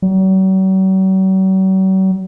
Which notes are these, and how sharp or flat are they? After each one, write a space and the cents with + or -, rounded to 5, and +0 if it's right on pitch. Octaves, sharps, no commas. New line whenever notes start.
F#3 +45